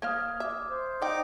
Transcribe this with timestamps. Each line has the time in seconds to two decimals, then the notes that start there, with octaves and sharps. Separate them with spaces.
0.02 A#3 C5 F5 D#6 F6 G#6
0.40 E5 D6
0.68 C5
1.02 D#4 D5 G5 D6